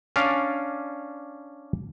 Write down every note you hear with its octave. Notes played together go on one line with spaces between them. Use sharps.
C#4 D4 D5 F5